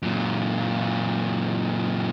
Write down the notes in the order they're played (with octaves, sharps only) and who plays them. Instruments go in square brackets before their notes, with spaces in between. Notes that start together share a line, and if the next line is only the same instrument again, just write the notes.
[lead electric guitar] F#2 A#2